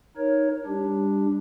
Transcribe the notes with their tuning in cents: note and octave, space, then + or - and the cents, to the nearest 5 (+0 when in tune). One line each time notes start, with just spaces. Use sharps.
D#4 +0 A#4 +15 C#5 +0
G3 +25 D4 +0 G4 +0